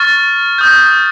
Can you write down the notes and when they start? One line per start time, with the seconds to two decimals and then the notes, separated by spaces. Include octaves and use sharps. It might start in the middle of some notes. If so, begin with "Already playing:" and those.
Already playing: C#6 F6 A6
0.58 D#6 G6